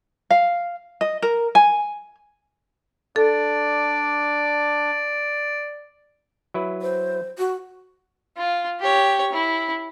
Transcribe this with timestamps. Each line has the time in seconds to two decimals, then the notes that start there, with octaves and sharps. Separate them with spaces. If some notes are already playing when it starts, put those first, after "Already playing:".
0.30 F5
1.01 D#5
1.22 A#4
1.55 G#5
3.16 D4 A4 D5
6.54 F#3 E4 B4
6.82 C5
7.39 F#4
8.37 F4
8.80 G4 C#5
9.33 E4